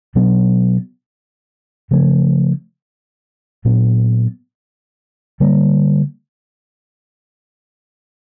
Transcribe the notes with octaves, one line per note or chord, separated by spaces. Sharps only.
B2 F#3 B3 D4
C#3 F3 A3 C#4
A#2 F#3 B3 D4
D3 G3 A#3